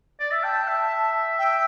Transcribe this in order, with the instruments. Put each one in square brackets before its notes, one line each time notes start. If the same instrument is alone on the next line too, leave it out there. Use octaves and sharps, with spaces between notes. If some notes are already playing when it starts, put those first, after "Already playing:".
[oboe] D5
E5
[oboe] G5 [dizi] A5
[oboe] E5
[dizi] G5